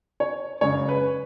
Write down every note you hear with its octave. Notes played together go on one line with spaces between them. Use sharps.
C#5
F#2 C#3 G#3 C#5
B4